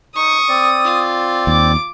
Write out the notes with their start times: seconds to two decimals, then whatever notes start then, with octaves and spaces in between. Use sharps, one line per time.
0.16 D#4 C#6 D#6
0.48 C4 D5
0.84 F4
1.47 D#2 D6